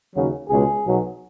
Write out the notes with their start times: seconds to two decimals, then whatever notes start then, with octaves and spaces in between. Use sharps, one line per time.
0.15 D#2 C#3 F#3
0.49 C#2 B2 G#3 G#4
0.84 B1 B2 F#3